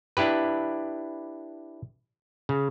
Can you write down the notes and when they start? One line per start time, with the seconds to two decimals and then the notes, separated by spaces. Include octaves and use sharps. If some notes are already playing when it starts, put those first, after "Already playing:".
0.17 D4 E4 G4 B4
2.49 C#3